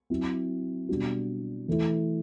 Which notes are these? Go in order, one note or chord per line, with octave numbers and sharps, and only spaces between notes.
F#3 C4 E4
B2 G3 D4 F#4
E3 A3 E4